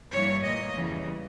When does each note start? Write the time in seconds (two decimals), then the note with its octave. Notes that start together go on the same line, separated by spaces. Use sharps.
0.12 G2 E3 G3 A#3 C#5
0.43 A#2 A#3 D#5
0.74 E2 C#3 E3 G3